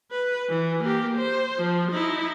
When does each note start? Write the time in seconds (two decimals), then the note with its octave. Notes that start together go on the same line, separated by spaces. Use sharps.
0.11 B4
0.49 E3
0.84 A#3 G4
1.18 C5
1.59 F3
1.92 D#4 E4